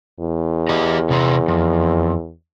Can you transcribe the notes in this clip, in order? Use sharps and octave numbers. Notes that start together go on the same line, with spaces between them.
E2
G4 D#5 A#5
C3 B3 A#5
F2